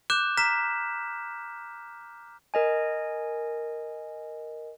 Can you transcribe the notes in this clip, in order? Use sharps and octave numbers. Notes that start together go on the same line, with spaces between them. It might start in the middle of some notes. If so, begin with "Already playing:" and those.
D6 F#6 G6 E7
A#5 F6 B6 E7
A#4 D#5 G#5